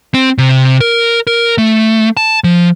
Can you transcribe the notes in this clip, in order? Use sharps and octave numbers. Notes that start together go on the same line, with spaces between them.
C4
C3
A#4
A#4
A3
A5
F3